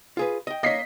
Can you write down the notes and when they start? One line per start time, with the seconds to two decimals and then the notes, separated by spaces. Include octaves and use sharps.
0.17 F4 G#4 B4
0.47 D#5 G5
0.63 A#3 C#5 D#5 B6 C7